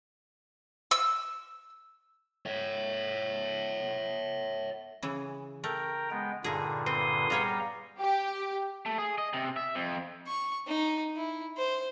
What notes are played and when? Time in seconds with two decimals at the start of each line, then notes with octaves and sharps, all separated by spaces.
0.91 E6
2.46 C#5 E5
5.03 C#3 E3
5.64 A3 A#4 G5 A#5
6.11 G#3 B3 G5
6.44 G2 A#2 D3 D#4 G#4
6.86 C4 B4 C6 D#6
7.30 G3 B3 G#4 C#5 F5 A#5
8.00 G4
8.86 A3
8.98 G#4
9.18 D#5
9.34 C3
9.56 E5
9.75 F2
10.27 C#6
10.67 D#4
11.16 E4
11.58 C5